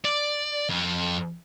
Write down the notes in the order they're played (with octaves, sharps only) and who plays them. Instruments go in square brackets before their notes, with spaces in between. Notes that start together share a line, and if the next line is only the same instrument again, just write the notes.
[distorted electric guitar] D5
F2